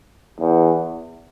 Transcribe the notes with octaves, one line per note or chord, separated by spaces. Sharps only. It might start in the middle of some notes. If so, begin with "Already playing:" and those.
E2